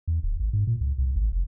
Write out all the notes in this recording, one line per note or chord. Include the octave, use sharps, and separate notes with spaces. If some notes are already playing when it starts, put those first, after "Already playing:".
E2
D1
G#1
G#2
A#2
C#2
C2
G#1
F1